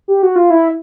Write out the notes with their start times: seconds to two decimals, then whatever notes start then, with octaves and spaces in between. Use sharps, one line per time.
0.08 G4
0.23 F#4
0.36 F4
0.50 E4